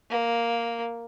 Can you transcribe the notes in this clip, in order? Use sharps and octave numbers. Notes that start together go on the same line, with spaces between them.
A#3